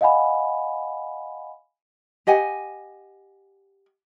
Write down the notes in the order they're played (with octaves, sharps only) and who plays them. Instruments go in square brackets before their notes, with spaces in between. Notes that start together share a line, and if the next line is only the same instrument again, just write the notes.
[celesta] D#5 F5 F#5 G#5 B5
[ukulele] G4 D#5 F#5 G#5